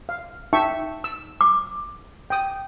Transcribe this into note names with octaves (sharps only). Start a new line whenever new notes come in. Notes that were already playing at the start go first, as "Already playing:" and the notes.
F5
D#4 E5 G5 C#6
E6
D6
G5 D#6